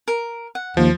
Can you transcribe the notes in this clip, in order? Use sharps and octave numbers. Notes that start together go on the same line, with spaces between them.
A#4
F#5
D#2 F3